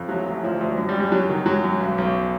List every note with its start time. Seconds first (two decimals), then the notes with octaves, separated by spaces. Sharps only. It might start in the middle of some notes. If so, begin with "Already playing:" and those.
Already playing: F2
0.09 A1 F#3
0.26 A1
0.44 D2 F3
0.61 D2
0.77 F#2
0.89 G3
0.95 F#2
1.00 G3
1.12 F#2 F#3
1.29 D#3
1.46 F#2 F#3
1.64 F#2
1.80 B1
1.98 B1